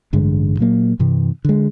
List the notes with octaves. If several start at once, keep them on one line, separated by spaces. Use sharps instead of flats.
A1 G2 D3 G#3
A#2 F#3 A#3
G2 C3 E3
D3 G#3